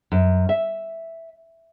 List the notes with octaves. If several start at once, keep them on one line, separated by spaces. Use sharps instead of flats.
F#2
E5